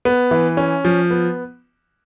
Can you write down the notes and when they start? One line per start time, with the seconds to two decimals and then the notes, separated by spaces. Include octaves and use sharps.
0.05 B3
0.31 E3
0.57 C#4
0.85 F3
1.11 B3